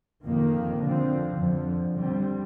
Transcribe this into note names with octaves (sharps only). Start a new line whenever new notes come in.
F2 D#3 A#3
D3 F3 C4
F2 D3 F3
D3 G3 C4